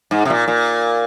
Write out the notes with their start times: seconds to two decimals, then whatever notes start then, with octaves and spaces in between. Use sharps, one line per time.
0.11 G#2
0.25 C3
0.30 A#2
0.48 A#2